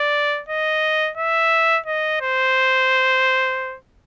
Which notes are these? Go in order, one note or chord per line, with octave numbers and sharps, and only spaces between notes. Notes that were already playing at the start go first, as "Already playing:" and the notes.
Already playing: D5
D#5
E5
D#5
C5